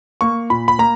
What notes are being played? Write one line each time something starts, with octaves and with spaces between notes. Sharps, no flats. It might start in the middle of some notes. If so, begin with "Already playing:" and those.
A#3 C#6
A#2 B5
B5
A#3 A#5